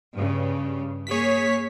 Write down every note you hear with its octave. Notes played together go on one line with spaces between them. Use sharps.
G2 C#3
A#3 G#4 C#5 B6